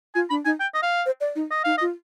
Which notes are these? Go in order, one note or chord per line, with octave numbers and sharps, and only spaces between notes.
F4 G#5
D4 B5
D#4 G#5
G5
D#5
F5
C5
D5
D#4
D#5
D#4 F5
D#5
F4